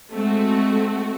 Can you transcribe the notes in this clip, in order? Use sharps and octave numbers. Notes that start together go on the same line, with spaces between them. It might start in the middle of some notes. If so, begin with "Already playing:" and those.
G#3 A3 C4 F#4